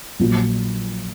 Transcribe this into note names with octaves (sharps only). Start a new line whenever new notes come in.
A#1 A#2 F#3